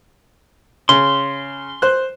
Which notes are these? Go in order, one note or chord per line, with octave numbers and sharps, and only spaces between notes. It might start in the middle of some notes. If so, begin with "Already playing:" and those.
C#3 C6
C5 F#6